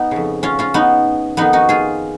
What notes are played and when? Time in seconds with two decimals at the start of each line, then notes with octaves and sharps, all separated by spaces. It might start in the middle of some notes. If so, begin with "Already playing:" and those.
Already playing: B3 D#4
0.11 F2 C#3
0.43 C#4 F4
0.59 C#4 F4
0.74 B3 D#4
1.37 F2 D#3 B3 D#4
1.53 D#4 F#4
1.69 F4 G#4